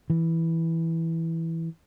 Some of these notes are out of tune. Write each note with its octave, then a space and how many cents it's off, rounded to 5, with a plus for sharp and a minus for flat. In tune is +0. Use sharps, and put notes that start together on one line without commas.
E3 -5